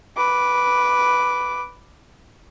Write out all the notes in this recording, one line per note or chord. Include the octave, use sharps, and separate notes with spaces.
B4 D6